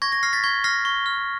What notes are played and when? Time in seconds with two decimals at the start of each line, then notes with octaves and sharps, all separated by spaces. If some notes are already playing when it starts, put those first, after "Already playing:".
0.02 C#6 G#6 A#6
0.12 G#6 A#6
0.23 F6 A#6 C7
0.33 A6 B6
0.44 C#6 G#6 A#6
0.64 F6 A#6 C7
0.85 C#6
1.06 F6